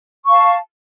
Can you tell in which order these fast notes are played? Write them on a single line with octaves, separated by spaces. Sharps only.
C#6 F5 A5